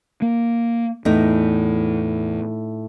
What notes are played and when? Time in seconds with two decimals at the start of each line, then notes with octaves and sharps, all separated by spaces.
0.22 A#3
1.05 E2 A2 D#4